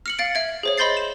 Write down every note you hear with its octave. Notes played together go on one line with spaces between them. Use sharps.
F6 C#7 F#7
F5 A6 D7
E5 G#6
G#4 C5 C#5
D#5 B5 C6 G6 A6 C7
E7